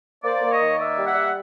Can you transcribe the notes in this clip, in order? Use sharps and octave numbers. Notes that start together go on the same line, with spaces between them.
A#3 C5 D5
A#3
C#5 D#5
D#3
A#3 D5 E5
G3
E5 F#5
G3